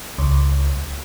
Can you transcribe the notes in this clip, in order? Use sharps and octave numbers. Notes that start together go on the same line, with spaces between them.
C#2